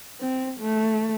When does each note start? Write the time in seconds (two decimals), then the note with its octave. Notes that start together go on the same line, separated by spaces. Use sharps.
0.21 C4
0.60 A3